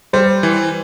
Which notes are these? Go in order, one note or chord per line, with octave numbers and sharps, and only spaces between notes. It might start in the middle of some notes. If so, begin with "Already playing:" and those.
G3 C5
E3